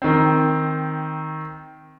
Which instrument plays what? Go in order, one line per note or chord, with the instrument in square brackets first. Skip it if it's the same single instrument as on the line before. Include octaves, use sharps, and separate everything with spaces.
[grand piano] D#3 C4